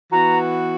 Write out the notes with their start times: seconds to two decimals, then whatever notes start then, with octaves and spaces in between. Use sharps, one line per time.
0.12 E3 B3 F#4 A#5